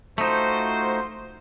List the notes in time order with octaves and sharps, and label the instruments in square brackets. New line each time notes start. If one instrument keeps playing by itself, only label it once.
[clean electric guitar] A3 D#4 [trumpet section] F4 F#4 C5